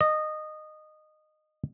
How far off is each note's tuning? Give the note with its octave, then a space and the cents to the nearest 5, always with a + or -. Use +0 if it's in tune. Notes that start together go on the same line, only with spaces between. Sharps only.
D#5 -15